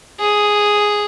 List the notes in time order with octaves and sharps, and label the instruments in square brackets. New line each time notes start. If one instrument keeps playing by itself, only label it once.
[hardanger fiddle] G#4